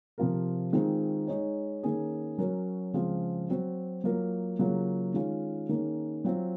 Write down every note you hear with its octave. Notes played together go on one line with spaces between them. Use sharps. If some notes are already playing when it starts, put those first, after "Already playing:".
C3 F3 C4 F4 A#4
D#3 G#3 C4 F4
G#3 D#4 G#4 C#5
D#3 A#3 C#4 G#4
F#3 C#4 F#4 A#4
C#3 F3 G#3 C4 F4
F#3 C4 F#4
F#3 A#3 F4 A#4
C#3 F#3 A#3 F4 G#4
D#3 G#3 C#4 F4
D#3 A#3 C#4 G#4
F#3 C4 F4